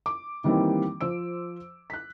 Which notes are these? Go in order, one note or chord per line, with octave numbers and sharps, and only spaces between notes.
D6
D#3 E3 G3 A#3 C4
F3 C5 E6 D7
F#6 B6